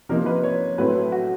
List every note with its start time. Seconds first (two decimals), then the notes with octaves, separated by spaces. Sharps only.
0.09 C3 F3 A#3 D#4 A#4
0.26 B4
0.44 C#5
0.78 A2 F#3 A3 C4 E4 B4
1.12 F#4